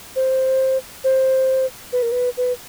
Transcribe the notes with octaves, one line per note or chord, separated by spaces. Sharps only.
C5
C5
B4
A#4
B4
B4